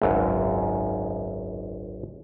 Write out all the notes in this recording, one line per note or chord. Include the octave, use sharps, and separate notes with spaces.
G#1 C#2 F#2